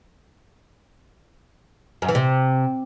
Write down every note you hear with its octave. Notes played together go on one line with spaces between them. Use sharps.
F#2
E3
C3